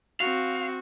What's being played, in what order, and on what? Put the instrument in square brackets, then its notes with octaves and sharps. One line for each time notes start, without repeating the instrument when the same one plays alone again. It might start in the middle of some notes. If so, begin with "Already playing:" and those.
[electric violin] C4 F#4 [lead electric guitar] F5